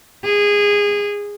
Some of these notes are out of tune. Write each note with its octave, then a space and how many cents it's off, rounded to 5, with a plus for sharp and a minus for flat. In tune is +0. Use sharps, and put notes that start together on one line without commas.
G#4 -20